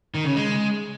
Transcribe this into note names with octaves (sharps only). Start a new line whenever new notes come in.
D#3
C#3
G#3